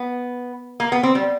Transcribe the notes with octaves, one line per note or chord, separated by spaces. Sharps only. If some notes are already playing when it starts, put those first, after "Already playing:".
Already playing: B3
A#3
B3
C4
G3